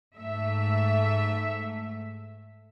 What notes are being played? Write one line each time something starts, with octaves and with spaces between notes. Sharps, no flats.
G#2 A3 E5